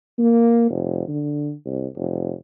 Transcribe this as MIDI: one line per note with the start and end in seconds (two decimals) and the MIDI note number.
0.18 0.66 58
0.70 1.08 29
1.08 1.52 50
1.66 1.86 36
1.96 2.32 29